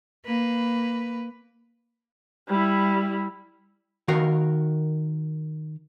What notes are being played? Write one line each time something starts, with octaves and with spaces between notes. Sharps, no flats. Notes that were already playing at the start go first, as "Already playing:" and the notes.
A#3 B4
G3 E4
D#3 F#4 A#4 F5